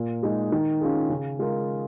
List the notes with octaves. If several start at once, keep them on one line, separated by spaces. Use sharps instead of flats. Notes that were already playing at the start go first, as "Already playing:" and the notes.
Already playing: A#2
G#3 D#4 A#4
D#3
C#4 F4 G#4
C#3
G#3 F4 A#4